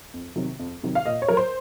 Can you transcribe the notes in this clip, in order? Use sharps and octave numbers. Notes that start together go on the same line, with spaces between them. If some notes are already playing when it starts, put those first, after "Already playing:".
F2
C3 D#3 F#3
F2
C3 D#3 F#3
F5
A#2 D#5
C#5
F#3 A#4
C5